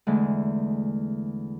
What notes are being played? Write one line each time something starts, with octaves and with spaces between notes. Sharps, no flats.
E2 D3 G#3 A3